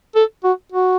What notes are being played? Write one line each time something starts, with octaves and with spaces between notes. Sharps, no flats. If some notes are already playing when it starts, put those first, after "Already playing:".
A4
F#4
F#4